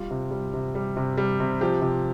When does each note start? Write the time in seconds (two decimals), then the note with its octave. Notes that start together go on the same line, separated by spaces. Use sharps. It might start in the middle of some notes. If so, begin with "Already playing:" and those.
Already playing: G3 F4
0.11 C3
0.31 G3
0.54 C3
0.75 G3
0.97 C3
1.18 G3
1.40 C3
1.61 F3 G4
1.82 C3